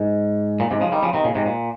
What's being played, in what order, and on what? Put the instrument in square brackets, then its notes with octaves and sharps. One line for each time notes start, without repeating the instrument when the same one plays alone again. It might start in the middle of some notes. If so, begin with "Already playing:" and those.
Already playing: [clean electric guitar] G#2
A#2
G#2 C3
C#3 F3
D#3 G3
C#3 F3
C3 D#3
A#2 C#3
G#2 C3
A#2